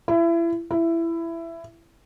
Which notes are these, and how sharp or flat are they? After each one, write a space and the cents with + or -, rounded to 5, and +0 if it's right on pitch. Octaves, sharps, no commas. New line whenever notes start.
E4 +30
E4 +15